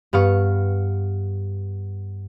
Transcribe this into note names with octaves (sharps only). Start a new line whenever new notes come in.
G2 B3 F5 C#6